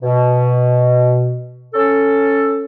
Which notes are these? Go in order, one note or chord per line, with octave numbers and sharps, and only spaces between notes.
B2
C#4 A4